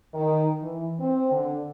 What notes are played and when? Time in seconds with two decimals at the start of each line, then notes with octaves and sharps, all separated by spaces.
0.14 D#3
0.62 E3
1.00 C4
1.32 D3